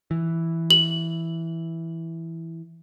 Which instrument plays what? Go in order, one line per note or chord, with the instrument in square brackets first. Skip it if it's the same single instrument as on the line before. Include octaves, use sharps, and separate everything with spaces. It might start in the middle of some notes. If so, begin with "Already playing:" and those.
[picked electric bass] E3
[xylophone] F#7